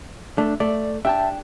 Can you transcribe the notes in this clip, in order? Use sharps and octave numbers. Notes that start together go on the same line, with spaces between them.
A3 D4
A3 D5
D4 G4 E5 G5 A5